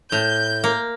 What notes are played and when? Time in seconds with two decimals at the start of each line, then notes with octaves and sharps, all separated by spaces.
0.12 A2 G6
0.64 A#3